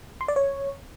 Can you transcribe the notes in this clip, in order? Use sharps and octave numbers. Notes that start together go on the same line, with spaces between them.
C6
D5
C#5